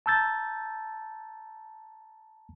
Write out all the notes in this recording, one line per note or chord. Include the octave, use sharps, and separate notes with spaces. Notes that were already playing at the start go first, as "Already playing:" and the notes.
A5 A#5 E6 G6 A6